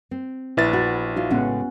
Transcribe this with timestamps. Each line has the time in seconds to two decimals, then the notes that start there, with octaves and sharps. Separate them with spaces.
0.11 C4
0.57 A#1 E4 B4 E5 A6
0.73 F#4
1.16 D#4 F4 F#4
1.31 A2 C#3 G#3 B3 C#4 F#5